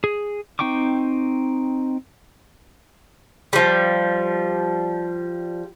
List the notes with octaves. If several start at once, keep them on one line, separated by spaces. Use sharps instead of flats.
G#4
C4 D#4 G5 C#6 D6
F3 G3